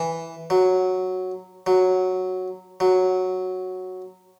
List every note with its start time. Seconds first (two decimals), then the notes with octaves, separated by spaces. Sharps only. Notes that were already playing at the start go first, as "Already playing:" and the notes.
Already playing: E3
0.50 F#3
1.67 F#3
2.80 F#3